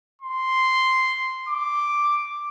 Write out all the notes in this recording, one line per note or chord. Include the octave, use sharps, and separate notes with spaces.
C6
D6